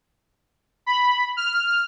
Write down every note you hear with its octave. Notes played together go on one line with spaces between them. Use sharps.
B5
F6